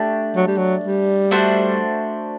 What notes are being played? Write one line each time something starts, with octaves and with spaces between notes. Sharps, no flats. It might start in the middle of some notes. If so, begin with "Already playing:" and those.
Already playing: A3 D4 G4
F#3
G3
F#3
G3
A3 D4 F#4 C5